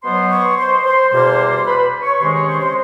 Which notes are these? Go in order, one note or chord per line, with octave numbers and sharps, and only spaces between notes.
B2 F#3 B3 C5 C6
C#5 C#6
C5 C6
C5 C6
E2 B2 G3 A#3 C5 C6
B4 B5
C#5 C#6
C3 D#3 G#3 C#4 C5 C6
C#5 C#6
C5 C6
C5 C6